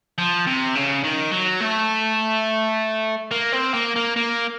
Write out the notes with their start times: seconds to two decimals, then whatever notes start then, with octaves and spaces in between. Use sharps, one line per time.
0.18 F3
0.47 C3
0.75 C#3
1.04 D#3
1.32 F#3
1.61 A3
3.31 A#3
3.52 C4
3.74 A#3
3.96 A#3
4.16 A#3